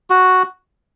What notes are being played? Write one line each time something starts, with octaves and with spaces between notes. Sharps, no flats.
F#4